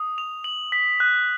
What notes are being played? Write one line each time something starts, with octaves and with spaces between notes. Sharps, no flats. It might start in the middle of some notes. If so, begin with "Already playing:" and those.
Already playing: D#6
F7
F#7
B6
F#6